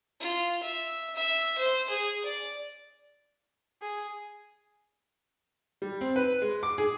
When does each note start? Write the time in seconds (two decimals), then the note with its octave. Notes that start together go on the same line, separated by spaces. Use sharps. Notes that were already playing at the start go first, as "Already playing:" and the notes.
0.20 F4
0.63 E5
1.15 E5
1.58 C5
1.89 G#4
2.25 D5
3.82 G#4
5.82 G3
6.01 C4
6.16 B4
6.42 G#3
6.63 D6
6.78 G#4